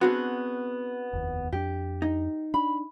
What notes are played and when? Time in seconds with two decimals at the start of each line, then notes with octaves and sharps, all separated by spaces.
0.01 B3 C4 D4 F#4 G#4
1.13 F1 D#2
1.52 F2 D4 G4
2.02 D#4
2.54 D4 B5